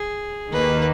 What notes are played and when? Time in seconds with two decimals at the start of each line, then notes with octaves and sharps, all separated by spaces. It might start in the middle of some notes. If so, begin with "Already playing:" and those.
Already playing: G#4
0.52 D#2 D#3 A#3 B4